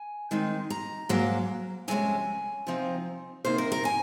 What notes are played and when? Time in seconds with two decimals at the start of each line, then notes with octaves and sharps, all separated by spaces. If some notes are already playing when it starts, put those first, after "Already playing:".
Already playing: G#5
0.31 D#3 G#3 C4 D#4
0.70 A#5
1.09 G#2 F#3 A#3
1.88 F2 C3 F3 G#3 C#4 G#5
2.67 C3 F3 C4 D#4
3.45 C3 D#3 A#3 C5
3.58 A#4
3.72 A#4
3.85 G#5